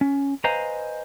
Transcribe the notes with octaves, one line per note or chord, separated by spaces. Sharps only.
C#4
B4 C5 D#5 F5 G#5 A#5